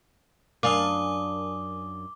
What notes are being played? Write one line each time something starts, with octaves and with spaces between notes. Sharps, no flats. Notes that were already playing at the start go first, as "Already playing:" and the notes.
F#2 D4 A#4 F5 G#5 D6 D#6 G7